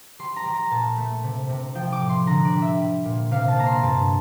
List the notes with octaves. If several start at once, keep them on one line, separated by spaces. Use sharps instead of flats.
G3 C6
A#5
G3
A#5
A#2 A5
A3
C3
C3
F3 G5
D6
A2
C6
D3 A#5
D5
G3
E5
G3
A#2
C3 F5
A5
A#3 A#5
C6
G2 A5